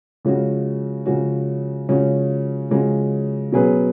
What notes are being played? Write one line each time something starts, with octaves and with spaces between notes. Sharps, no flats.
C#3 F3 G#3 C#4 F#4
C#3 F3 G#3 C#4 F#4
C#3 F3 G#3 C#4 F#4
C#3 F3 G#3 C#4 F#4
B2 F#3 C#4 G#4 B4